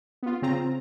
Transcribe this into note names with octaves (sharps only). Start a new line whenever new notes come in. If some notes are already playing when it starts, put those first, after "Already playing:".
B3 F4
C#3 C4 F4 A#5